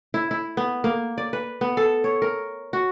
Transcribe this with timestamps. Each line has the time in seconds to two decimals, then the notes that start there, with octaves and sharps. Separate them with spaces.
0.14 E4
0.31 E4
0.57 B3
0.84 A#3
1.18 D5
1.33 B4
1.61 B3
1.77 A4
2.04 C#5
2.22 A#4
2.73 F#4